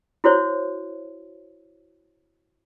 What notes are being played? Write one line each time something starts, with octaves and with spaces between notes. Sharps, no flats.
E4 F#4 C5 C#5